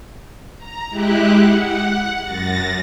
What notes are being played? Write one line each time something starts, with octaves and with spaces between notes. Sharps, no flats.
A#5
G#3 E4 G4 F#6
F#5
F#2 A6 A#6